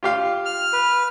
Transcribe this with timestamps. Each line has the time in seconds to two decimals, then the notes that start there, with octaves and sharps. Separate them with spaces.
0.03 F4 G4 F5
0.45 F6
0.73 B4